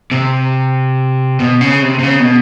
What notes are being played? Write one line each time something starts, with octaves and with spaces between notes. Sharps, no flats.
C3
B2
C#3
C3
C3
C#3
B2